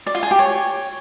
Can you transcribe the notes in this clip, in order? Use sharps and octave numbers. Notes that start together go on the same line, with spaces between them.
D5
F4
G#4
G4
C#5